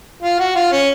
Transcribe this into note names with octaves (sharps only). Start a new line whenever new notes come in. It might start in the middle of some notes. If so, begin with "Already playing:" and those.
F4
F#4
F4
C#4